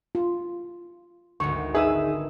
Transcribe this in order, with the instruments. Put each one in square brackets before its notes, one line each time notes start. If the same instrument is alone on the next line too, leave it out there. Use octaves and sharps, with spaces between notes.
[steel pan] F4
[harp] G#1 D2 [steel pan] C#6
[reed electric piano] D#4 G#4 [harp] B4 D#6 E6 [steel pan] E5